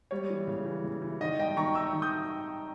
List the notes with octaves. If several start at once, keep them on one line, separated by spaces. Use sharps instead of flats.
G3 C#5
E3
C#3
E3
C#3
E3
D#3 D#5
G2 D#5 G5
D#3 A#5 C#6
D#4 C#6 E6
D#3
D#6 G6